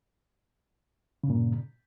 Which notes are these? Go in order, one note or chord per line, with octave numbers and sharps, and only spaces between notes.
G2 A#2 C#3